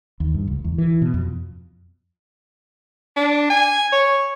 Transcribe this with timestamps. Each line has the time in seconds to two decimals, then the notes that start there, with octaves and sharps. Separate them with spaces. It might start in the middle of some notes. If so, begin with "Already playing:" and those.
0.20 D#2
0.34 G2
0.47 C#2
0.64 E2
0.78 E3
1.02 B2
1.14 F2
3.16 D4
3.50 G#5
3.93 C#5